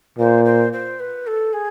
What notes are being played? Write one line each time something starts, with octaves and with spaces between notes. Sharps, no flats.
A#2 C5
C5
C5
B4
A4
G#4